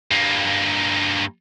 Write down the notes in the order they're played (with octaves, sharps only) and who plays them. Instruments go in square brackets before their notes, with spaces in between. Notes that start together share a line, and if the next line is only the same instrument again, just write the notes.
[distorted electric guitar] G2 A#3